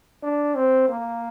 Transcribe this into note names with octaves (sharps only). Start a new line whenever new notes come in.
D4
C4
A#3